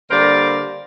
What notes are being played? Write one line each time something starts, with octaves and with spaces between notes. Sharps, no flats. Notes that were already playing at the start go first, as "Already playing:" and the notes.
D3 G3 A#3 A#4 C5 D5